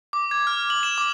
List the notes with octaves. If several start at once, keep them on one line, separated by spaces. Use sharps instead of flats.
D6
G#6
F6
F#7
E7
D6